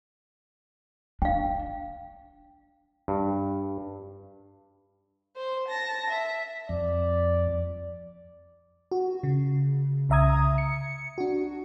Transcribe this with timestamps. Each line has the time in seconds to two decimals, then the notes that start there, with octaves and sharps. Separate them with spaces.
1.22 D4 F5 G5
3.08 G2
5.37 C5
5.68 A5 A#6
6.10 E5
6.69 F2 D5
8.92 F#4
9.23 C#3
10.09 C2 C#3 E5 A#5 D#6 G#6
10.58 C#7
11.18 D4 F#4